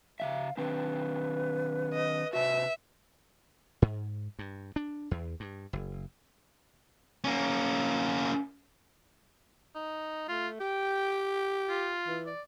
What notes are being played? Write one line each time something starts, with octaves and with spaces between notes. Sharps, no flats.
C#3 F3 E5 F5
D#3 C4 D4 B4
D#5
C3 F#4 E5
G#2
G2
D4
E2
G2
F#1
A#3 C#4
D#4
A3 F4
G4 G5
F4
E3
D5